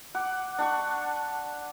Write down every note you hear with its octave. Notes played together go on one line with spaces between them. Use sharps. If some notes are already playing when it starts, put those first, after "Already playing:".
F#5 D6
D4 F#5 C#6